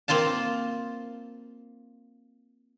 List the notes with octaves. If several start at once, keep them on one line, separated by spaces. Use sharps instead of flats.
A#3 C4 F4 F5 A5